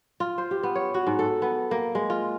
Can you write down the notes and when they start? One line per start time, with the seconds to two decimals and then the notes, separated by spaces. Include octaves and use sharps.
0.20 F4
0.38 C5
0.51 G4
0.63 B3
0.75 C#5
0.94 F#4
1.07 G#2
1.19 A4
1.42 B3
1.71 A#3
1.95 G#3
2.10 F4